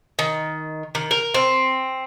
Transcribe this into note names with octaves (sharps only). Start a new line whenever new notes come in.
D#3
D#3
A#4
C4